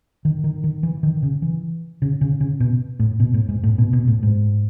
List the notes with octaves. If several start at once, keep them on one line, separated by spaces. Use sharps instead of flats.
D#3
D#3
D#3
E3
D#3
C#3
E3
C#3
C#3
C#3
B2
A2
B2
A2
G#2
A2
B2
B2
A2
G#2